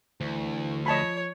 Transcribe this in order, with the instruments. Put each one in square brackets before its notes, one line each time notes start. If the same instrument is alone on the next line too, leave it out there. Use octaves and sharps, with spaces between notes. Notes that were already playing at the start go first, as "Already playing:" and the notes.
[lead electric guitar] D2 [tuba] E3
[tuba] F3 [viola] C#5 [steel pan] D#5 A5 B5